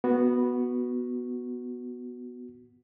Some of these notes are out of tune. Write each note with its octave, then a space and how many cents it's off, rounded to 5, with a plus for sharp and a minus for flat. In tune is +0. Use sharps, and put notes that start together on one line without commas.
B3 -5 F#4 -5